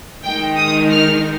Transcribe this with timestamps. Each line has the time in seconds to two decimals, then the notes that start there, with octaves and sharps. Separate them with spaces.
0.23 D#3 G#3 D#4 G5
0.58 D#6
0.91 F6